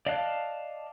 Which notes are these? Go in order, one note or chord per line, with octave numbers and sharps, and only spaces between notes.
D5 D#5 F5 A5 F#6